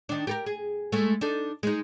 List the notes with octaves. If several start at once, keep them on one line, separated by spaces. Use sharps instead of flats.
D#3 D4
G4 A4 A#4
G#4
G#3 A3
D4 D#4 A4
G#3 D#4